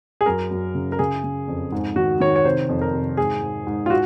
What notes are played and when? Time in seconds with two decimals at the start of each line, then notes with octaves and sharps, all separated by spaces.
0.21 G#4
0.26 F#2 A#4
0.51 F#2
0.75 C#3
0.92 A#4
0.99 C#3 G#4
1.24 C#3
1.48 F2
1.72 G#2
1.96 D#3 F#4
2.20 D#3 C#5
2.36 C#5
2.45 C3 C5
2.69 F2
2.81 A#4
2.93 C3
3.17 G#2 G#4
3.42 G#2
3.67 G#2
3.86 F4
3.90 F#4